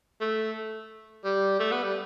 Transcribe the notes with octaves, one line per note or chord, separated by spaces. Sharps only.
A3
G3
A3
B3
G3